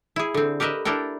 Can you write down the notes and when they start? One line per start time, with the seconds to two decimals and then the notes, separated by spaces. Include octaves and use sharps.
0.16 E4 G#4
0.34 D3 C4
0.60 G4 A#4 B4 D#5 E5
0.85 D4 E4 A4 A#4 G5